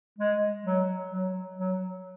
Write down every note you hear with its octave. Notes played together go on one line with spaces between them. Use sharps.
G#3
F#3
F#3
F#3